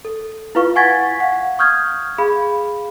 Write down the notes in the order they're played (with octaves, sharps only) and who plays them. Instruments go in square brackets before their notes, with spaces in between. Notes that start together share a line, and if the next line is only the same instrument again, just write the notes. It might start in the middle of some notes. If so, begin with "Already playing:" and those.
[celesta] A4
E4 F4 B4 F5 C#6
F#5 G#5 C#6 G#6 A6 B6
F5 F#5
C#6 D#6 F6 G6 G#6
G#4 F5 B5